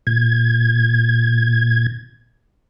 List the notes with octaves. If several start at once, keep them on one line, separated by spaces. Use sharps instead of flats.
A#2 G#6